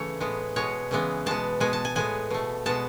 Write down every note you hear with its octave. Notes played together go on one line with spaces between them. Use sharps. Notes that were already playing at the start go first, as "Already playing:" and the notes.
Already playing: C#3 E3 A3 C#5
A2 G#3 B3
B2 G#3 B3 C#5
C#3 E3 G#3 B3
B2 G#3 B3 A5
B2 G#3 B3 G#5
A5
G#5
A2 G#3 B3 G#5
B2 A3
B2 G#3 B3 A5